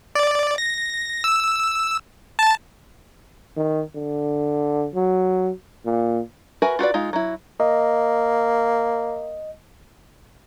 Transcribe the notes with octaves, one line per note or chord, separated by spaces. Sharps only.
D5
A#6
E6
A5
D#3
D3
F#3
A#2
F#4 A#4 B4 E5 G#5
F4 F#4 B4 D5
G#3 D#4 F4
F#3 E4
A#3 D#5